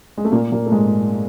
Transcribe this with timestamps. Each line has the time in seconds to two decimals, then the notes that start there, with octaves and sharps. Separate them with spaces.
0.18 G#3
0.25 A3
0.32 A#2 A#3
0.52 A#2 A#3
0.66 A3
0.72 G#2 G#3